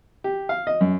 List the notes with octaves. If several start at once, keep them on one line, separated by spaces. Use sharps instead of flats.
G4
F5
D#5
F#2